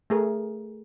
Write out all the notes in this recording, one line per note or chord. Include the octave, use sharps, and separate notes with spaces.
A3 G#4 A#4